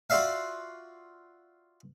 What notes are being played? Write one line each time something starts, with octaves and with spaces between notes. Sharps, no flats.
F4 F#4 D5 E5 F5